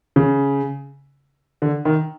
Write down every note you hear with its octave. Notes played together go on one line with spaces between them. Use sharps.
C#3
D3
D#3